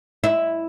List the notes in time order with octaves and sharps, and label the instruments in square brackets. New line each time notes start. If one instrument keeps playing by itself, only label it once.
[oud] E4